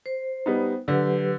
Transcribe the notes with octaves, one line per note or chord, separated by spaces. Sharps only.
C5
G3 B3 D#4
D3 F#3 G4 B4